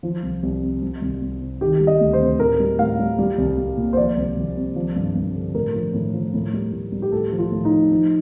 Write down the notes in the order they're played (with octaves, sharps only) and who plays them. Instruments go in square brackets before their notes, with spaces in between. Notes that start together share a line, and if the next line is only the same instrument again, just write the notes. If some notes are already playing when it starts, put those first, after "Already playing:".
[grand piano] F3 F4
C2
C2
C3
G3
C2
C2
C3
D#3 G4
G3
D#5
D2
C5
C3
A2 A#4
G3
A2 F5
G3
G3
C2
C2
A#2
C5
F3 D5
C2
C2
C3
F3
G2
G2
D3
A2 A#4
F3
A2
F3
A2
G3
A2
G3
G4
A2 A4
F3
F4
A2
D#4
F3
F3